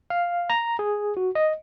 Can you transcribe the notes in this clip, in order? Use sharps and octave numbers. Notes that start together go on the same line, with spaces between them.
F5
A#5
G#4
F#4
D#5